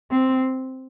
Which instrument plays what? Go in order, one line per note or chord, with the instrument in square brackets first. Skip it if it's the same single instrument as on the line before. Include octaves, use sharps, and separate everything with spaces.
[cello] C4